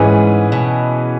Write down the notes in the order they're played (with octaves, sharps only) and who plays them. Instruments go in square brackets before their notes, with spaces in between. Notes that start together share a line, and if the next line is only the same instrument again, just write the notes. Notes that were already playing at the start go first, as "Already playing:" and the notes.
Already playing: [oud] G#2 [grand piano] E3 C#4 G#4 B4
[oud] B2